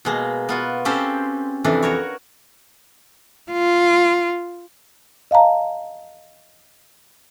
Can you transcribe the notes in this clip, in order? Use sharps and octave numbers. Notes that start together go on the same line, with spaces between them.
B2 G#3 A#3
B3 F4 F#4
C4 C#4 G4 A4 B4 C5
F2 C3 E3 D4 B4
F#4 A#4 C#5
F4
D#5 F5 A5 A#5